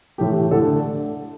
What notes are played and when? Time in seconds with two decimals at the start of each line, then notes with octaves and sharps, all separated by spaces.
0.18 A2 E3 A3 G4
0.51 D3 A4
0.55 A3